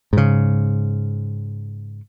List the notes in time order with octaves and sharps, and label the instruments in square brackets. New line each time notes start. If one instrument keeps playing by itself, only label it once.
[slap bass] G#2 C#3